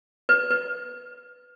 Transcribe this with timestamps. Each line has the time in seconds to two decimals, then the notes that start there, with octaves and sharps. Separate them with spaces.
0.29 B4
0.51 B4